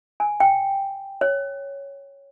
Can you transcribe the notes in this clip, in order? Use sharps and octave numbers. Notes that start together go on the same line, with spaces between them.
G#5
G5
C#5